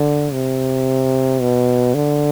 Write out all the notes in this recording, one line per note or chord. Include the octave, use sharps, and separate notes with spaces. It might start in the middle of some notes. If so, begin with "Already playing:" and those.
Already playing: D3
C3
B2
D3